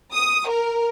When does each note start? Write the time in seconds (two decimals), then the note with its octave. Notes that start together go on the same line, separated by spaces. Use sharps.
0.12 D#6
0.48 A#4